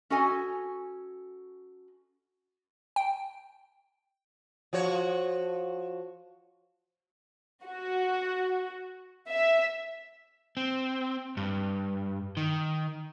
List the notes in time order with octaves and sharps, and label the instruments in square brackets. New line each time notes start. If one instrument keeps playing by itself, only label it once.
[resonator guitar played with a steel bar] C#4 F#4 A4 D#5 G#5
[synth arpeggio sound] G5
[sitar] F3 F#4 C#5
[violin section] F#4
E5
[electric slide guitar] C4
G2
D#3